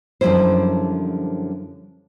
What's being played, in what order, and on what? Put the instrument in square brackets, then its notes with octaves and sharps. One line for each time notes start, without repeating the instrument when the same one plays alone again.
[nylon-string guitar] F#2 D3 F3 G3 E4 C5